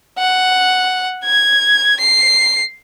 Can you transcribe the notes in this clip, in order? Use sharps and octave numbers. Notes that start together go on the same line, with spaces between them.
F#5
G#6
C7